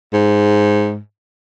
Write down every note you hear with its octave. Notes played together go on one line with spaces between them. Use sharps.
G#2